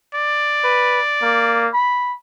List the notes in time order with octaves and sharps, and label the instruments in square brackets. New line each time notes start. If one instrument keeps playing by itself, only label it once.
[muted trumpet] D5
[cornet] B4
A#3
B5